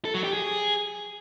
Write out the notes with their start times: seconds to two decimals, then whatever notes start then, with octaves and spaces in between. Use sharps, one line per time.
0.05 A4
0.15 F#3
0.24 G4
0.33 G#4